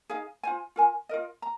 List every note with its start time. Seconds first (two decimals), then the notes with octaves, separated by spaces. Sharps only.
0.10 D#4 G#4 F5
0.43 F4 C5 G#5
0.76 F4 A#4 G#5
1.09 F4 A#4 D#5
1.42 A#5